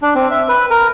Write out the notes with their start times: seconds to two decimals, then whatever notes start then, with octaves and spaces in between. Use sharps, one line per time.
0.02 D4
0.15 C4
0.31 E5
0.49 B4
0.70 A#4